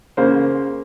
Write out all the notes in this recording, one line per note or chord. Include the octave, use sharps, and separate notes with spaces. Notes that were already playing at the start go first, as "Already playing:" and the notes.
C#3 A#3 C5